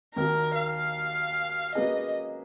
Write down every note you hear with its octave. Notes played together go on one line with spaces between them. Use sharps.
D#2 D#3 F#3 A#3 A#4
F5
F#3 A#3 C#4 G#4 B4 D#5